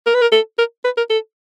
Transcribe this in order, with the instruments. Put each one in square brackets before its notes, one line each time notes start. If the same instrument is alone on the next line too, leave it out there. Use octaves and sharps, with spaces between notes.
[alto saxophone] A#4
B4
A#4
A4
A#4
B4
A#4
A4